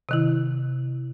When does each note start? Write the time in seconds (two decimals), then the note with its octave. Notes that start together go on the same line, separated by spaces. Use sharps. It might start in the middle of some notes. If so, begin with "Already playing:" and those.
0.09 C3 D#3 E4